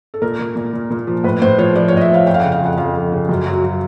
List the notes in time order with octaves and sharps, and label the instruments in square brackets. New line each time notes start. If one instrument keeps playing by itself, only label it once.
[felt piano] A4
A#2 A#4
A#2
A#2
A#2
A#2
F3
A2 B4
A2 C5
F3 C#5
F3 D5
C#5
A2 D#5
E5
F3 F5
F2 G5
F5
F#5
C#3
F5
F2 F#5
F2 F5
F2
C#3
F#2
F#3
F#3